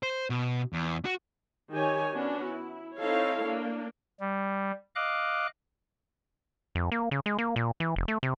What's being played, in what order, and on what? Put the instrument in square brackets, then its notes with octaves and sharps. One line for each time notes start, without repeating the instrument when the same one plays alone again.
[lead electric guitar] C5
B2
E2
F#4
[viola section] D#3 G4 C#5 G#5
B3 C#4 D4 F#4
E4
C4 D#4 E4 A4 C#5 F5
A#3 D4
[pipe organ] G3
D#5 F5 D6 F#6
[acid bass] F2
A#3
C#3
G#3
A#3
A#2
E3
F1
A3
C3